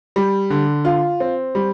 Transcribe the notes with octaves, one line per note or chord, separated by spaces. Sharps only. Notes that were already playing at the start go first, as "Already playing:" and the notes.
G3
D3
F4
C4
G3